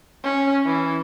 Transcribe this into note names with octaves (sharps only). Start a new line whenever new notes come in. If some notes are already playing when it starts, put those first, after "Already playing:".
C#4
E3